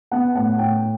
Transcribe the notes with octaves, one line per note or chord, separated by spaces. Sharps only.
B3 F#5
A2 F#5
A2 G5